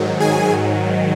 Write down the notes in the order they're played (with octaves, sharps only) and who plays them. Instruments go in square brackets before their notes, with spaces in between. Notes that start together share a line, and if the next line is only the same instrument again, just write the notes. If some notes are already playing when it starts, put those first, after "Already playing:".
Already playing: [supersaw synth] G#2 D#3 F#3
G#4 G#5